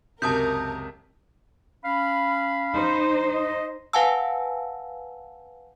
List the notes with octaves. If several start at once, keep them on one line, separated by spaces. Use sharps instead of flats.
C#2 F#2 C3 A#4 A5 D#6 G6
C#4 F5 B5
D#4 C5
D#5
B4 F5 F#5 G#5 A5 E6